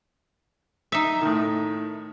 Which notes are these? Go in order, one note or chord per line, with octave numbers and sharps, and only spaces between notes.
D#4 E5
A2 D#3